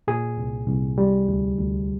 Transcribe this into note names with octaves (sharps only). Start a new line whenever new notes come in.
A#2 G#4
C2
C2
G3
D2
D2